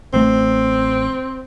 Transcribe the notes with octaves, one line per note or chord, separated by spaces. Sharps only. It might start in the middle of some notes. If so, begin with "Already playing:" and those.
A1 A3 C4